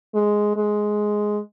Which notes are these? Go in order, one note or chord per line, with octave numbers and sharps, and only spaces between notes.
G#3
G#3